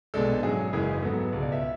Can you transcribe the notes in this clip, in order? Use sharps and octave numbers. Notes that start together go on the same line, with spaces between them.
B1 B2 G#3 D4 A4
G#2 F#3 C#4 G#4
F#1 F#2 C#3 E3 G#3 G#4
G#2 F#3 B3 A4
C#2 B2 G#3
D5
E5